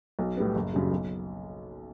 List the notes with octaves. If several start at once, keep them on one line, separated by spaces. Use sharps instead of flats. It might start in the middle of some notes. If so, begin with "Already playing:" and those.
B1
A2 G3 B3
F#1
F#2 C#3 G3
B1